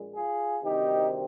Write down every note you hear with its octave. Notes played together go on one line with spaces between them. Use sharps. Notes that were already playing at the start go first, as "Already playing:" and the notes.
Already playing: A#1 A#2 G#3
F4 G#4
D2 C3 D#3 G3 C4 D#4 G4